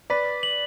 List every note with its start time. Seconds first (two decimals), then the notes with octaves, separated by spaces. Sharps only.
0.10 B4 D5 B6
0.43 F#7